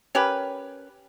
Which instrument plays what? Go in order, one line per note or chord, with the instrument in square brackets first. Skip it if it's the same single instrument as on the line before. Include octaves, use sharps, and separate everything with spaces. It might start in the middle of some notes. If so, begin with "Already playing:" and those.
[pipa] C#4 G4 A#4 B4